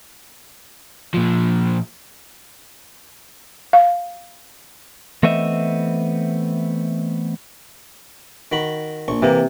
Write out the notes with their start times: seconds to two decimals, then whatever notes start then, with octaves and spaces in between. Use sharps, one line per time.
1.14 A#2 F3
3.73 F5
5.23 E3 A3 B3 C4 D#5 E5
8.52 D#3 F#4 B5
9.08 A#1 C#6
9.22 C3 E3 A#3